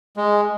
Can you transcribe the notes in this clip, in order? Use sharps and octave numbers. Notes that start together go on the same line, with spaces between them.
G#3